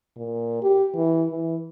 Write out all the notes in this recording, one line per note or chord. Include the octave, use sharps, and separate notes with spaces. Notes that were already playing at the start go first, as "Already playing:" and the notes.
A#2
G4
E3
E3